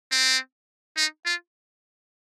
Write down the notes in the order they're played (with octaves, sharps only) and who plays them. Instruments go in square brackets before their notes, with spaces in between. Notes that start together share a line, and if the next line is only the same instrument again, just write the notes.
[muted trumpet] C4
D#4
F4